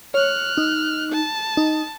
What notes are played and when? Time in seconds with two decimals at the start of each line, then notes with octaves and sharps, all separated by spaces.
0.14 C#5 F6 F#6
0.57 D#4
1.12 A5
1.57 D#4